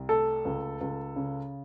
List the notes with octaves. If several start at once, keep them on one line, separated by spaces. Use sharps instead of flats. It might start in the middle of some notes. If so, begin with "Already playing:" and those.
Already playing: C2
A3 A4
C#2
C#2
C#3